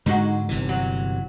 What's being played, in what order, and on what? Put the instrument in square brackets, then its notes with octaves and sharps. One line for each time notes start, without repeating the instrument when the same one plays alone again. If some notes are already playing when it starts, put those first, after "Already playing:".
[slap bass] G#2 D3 G#3 [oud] D#4 F#4
[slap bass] G1 C3 E3
[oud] F#3